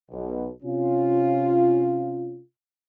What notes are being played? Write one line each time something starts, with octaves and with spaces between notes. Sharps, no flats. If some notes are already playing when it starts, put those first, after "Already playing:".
B1 B2
C3 C#4 F4